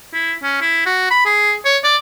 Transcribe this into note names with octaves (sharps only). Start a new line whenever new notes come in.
E4
C#4
E4
F#4
B5
G#4
C#5
D5